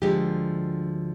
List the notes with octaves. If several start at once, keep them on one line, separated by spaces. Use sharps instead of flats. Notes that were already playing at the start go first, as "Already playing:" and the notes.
D2 D3 F3 G#3 G4